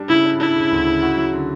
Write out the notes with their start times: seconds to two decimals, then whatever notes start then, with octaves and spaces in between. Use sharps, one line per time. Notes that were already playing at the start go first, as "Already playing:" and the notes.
Already playing: G3 D4
0.09 C#3 E4
0.25 D4
0.40 D4 E4
0.56 C#3
0.71 D2
0.86 C#3
1.02 F#4
1.17 F#3
1.33 D3